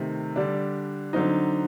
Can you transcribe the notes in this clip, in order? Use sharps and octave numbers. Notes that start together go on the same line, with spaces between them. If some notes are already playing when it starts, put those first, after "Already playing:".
Already playing: C3 D#3 A3 C4
D3 G3 D4
D3 F#3 C4 D#4